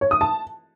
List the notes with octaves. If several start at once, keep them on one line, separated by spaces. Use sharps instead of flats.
C#5
D#6
A5